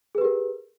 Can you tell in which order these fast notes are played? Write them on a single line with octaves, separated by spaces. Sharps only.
G#4 B4 G4 A#4